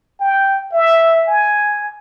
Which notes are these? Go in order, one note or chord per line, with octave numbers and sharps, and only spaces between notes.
G5
E5
G#5